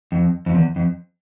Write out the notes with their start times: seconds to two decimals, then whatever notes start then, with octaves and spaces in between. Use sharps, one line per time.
0.12 F2
0.46 F2
0.55 E2
0.76 F2